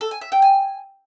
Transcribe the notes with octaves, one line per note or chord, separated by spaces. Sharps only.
A4
G#5
E5
G5
G#5